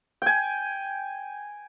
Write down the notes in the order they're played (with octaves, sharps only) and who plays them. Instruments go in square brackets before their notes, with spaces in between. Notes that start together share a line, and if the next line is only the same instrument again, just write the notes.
[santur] G5 G#5